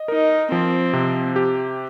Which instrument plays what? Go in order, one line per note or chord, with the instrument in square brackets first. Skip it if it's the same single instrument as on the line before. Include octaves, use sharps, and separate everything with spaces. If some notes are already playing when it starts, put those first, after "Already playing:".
Already playing: [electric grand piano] D#5
[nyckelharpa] D#4 [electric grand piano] A#4
[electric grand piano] F3 [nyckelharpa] C4
[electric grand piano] C3
G4